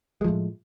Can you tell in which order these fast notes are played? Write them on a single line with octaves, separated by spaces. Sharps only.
G#3 F3 A2